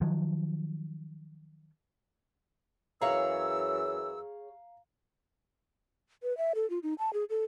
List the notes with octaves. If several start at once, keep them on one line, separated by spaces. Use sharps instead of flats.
D#3 F3 F#3
F#2 E3 G#4 C#5 F5 A#5 E6
B4
E5
A4
F4
D#4
A5
G#4
A4